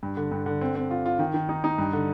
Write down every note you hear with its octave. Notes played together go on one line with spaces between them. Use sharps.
G2
D3
G2
D3
C4
C4
F4
F4
D#3
D#3
D#4
D#4
G2
D3